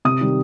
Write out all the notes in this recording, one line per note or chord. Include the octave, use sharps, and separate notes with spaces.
C3 D#6
D#3 G3